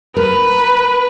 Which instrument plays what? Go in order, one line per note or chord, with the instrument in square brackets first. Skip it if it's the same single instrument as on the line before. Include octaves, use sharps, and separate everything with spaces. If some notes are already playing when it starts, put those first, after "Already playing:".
[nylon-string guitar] A#4 [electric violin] B4